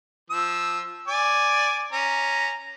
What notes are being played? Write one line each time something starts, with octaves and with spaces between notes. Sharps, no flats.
F3 E6
D5 G#5 D6
C#4 A#5